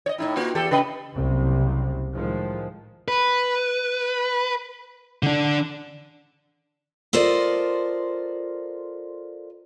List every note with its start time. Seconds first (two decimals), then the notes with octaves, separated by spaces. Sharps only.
0.06 C#5 D#5
0.18 A2 D#4 E4
0.37 A#3 F4 F#4
0.55 E2 G4 A4
0.71 C#3 B4 D#5
1.14 F#1 C2 C3
2.14 A2 D#3 F3 G#3
3.08 B4
5.23 D3 D4
7.13 F4 A4 A#4 C5 D5 D#5